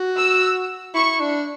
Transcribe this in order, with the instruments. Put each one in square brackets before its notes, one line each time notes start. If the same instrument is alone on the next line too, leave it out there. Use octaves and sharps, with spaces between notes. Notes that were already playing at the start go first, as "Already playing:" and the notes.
Already playing: [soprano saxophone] F#4
[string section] E6
[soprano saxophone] E4 [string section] C#6
[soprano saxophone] D4